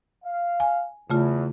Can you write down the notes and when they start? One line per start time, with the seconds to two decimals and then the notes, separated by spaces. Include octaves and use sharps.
0.25 F5
0.60 G#5
1.10 E2 C#3 A3 F4